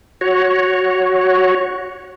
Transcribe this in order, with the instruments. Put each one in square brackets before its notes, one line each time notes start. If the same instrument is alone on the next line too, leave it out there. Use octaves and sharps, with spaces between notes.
[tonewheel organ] F#4 C#5